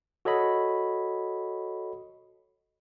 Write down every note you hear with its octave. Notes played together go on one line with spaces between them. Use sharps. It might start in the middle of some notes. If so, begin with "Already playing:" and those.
F#4 A4 C#5 D#5 B5